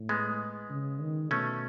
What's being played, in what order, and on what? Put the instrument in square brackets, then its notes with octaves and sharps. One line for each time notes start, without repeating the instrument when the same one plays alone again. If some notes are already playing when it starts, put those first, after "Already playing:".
Already playing: [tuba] A2
[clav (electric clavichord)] G#3 B3
[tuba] C#3
D#3
[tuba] B2 [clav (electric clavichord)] A3 C#4